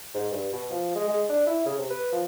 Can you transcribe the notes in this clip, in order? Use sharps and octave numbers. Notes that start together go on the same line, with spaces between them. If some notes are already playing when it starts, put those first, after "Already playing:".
G#2
G2
B2
F3
G#3
G#3
D4
E4
C#3
C3
B4
F3